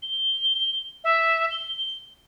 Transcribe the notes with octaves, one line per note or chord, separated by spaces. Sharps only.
G7
E5
G7